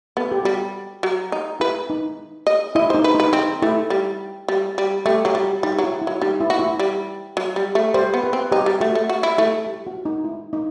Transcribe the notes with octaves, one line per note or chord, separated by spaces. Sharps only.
B3 A4
G4
G3 F#4
F#3
D#4
E4 B4
D#4
D#5
E4 D#5
D#4 C5
B4
D#4
B4
C4 D#4
A3 E4
G3
G3
G3
A3 G4
F#3 G4
G3
F#4
G3 D#4
F#3
E4
E4
F#3
G3 D#4
E4
F#4
E4
G3
F#3
G3
A3
G3 C5
B3
B4
C4
D#4 G4
G3
A3 F#4
A3
F#4
E4
A3 E4
G4
F#4
D#4
E4
D#4